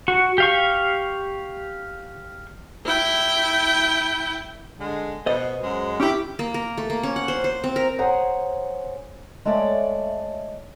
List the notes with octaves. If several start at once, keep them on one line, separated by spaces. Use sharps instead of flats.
F#4
G4 F5 C#6
E4 G5
D3 G#3
B2 C5 D#5
F#2 G#3
C#4 E4 G4
A#3
A#4
A3
A#3
C#4
F#5
C5
C5
C4
A#4
G#4 C5 C#5 F#5 G#5 A#5
G#3 A3 C#5 D5 E5